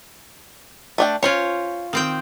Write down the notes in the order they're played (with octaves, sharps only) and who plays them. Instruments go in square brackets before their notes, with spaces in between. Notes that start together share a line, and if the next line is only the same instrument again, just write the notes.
[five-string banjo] A3 D4 G5
[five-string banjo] C#4 C5 [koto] F4 C#5
[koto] D#3 C4 G5